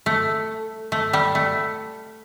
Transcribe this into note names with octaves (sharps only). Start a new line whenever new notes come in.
A3
A3
G3
A3